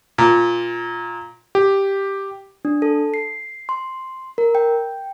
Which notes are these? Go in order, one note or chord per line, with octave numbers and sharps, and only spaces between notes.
A#2
G4
D4
A4
C7
C6
A#4
G5